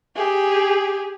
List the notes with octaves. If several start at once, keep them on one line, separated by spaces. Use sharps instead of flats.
G4 G#4